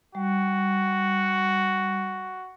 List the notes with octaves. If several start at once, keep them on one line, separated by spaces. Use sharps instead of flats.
G3 F#4